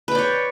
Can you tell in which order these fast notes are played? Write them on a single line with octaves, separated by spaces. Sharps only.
B4 G5 D5 C#5